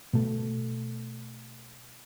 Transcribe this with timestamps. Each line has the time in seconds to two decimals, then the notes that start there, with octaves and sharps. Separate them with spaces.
0.13 B2 A3